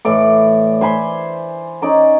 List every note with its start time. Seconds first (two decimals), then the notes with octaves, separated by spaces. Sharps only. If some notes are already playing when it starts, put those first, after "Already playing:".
0.05 A2 E3 D5 D6
0.81 C5 G#5 B5 C6
1.82 C#4 D#4 D5 A#5